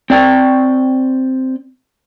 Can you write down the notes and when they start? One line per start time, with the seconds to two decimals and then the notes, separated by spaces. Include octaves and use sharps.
0.10 C4 D5 G5